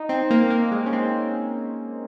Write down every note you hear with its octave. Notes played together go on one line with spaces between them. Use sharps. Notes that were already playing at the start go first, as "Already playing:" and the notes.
Already playing: D#4
C4
A#3
A#3
G#3
C#4
C4